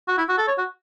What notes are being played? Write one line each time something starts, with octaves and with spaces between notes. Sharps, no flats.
F#4
E4
F#4
A4
C#5
F#4